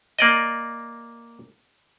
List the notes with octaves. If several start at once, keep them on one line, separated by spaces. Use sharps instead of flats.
A#3 D5 D#5